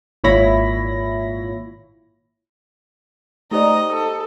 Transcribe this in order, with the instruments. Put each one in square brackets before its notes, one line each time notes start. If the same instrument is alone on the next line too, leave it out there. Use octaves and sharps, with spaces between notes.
[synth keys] G#1 A#2 E4 C#5 B5 A#6
[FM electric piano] A3 D5 [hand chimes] D#4 G4 C5 [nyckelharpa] D#5 [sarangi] A#5
[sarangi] A4 [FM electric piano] D#6